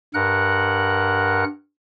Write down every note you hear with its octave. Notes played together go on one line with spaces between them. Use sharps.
G2 A#4 F#5 F#6